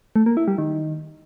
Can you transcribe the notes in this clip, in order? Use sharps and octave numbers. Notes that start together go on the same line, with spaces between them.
A3
A#3
E4
G3
D#3